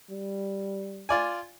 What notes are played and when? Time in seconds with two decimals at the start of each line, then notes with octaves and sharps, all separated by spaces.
0.10 G3
1.09 F4 D5 G#5